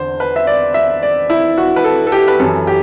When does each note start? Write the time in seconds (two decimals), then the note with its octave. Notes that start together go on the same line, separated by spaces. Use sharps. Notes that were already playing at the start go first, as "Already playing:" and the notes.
Already playing: E2 D3 C5
0.20 B4
0.36 E5
0.47 D5
0.74 E5
1.03 D5
1.30 E4
1.58 F#4
1.76 B4
1.84 A4
2.07 A4
2.12 G4
2.28 B4
2.40 F#2 E3 A4
2.67 G4